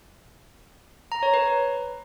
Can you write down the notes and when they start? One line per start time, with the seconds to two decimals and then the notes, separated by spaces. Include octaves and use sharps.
1.12 A#5
1.23 C#5
1.34 B4